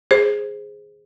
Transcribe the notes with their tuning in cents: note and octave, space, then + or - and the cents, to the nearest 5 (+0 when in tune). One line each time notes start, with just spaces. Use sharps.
G#4 +0 C5 +5